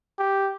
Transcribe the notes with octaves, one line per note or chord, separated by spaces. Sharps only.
G4